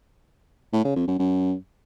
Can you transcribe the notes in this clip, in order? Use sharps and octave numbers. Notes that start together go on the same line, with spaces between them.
A2
C#3
F2
F#2
F#2